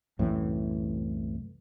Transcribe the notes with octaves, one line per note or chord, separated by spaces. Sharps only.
C2 F#2 A2 E3